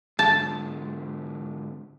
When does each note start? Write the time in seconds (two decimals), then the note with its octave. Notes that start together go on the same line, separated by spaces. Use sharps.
0.19 G#2 D3 A5